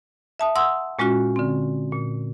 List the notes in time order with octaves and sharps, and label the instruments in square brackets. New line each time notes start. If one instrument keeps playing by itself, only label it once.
[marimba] E5 A5 D#6
F#5 C6 D#6 E6
A#2 G#3 C#4 F4 F#4
D3 C4
A#2